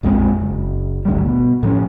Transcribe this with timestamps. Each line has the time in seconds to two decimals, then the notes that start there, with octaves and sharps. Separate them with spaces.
0.03 A#1 F2 G#3 C4
0.42 F#1
1.05 G#1 D2 G3
1.25 B2
1.63 A2 F3 C#4